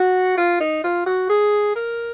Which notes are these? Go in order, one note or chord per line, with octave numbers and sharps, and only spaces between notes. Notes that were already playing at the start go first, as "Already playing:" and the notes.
Already playing: F#4
F4
D#4
F4
F#4
G#4
A#4